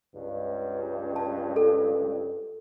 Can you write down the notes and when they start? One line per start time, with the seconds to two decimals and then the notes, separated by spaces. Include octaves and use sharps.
0.14 C#2 G2
1.16 A5
1.56 A4